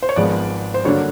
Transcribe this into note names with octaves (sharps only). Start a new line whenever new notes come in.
C5
C#5
G#1 G#2 F3 G#3 B3 D5
C5
G2 D3 F#3 A#3 D4 C#5